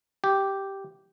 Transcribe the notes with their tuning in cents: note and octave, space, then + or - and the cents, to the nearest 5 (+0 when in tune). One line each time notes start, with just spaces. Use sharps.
G4 -5